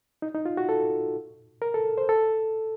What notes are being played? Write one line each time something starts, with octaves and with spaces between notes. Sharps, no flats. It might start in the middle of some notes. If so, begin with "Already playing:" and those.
D#4
D#4
F4
F#4
A4
A#4
A4
C5
A4